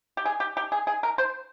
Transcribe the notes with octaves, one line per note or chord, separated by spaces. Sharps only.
G4
G#4
G4
G4
G#4
G#4
A#4
C5